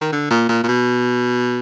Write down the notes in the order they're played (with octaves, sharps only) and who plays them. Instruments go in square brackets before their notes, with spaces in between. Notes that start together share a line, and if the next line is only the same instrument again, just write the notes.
[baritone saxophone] D#3
D3
A#2
A#2
A#2
B2